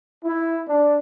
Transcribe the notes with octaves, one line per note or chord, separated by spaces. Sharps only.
E4
D4